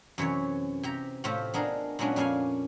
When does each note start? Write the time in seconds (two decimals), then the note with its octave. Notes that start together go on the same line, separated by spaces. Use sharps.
0.18 F#2 C3 E3 C#5
0.83 C3 G4 A#5
1.24 A2 C3 A3 C4 F4 G4
1.54 B3 D4 D#4 G#4 A#4
1.99 A#2 F#3 G#3 B3 C#4 D4
2.16 F2 A#2 C#4 D5 F5 G#5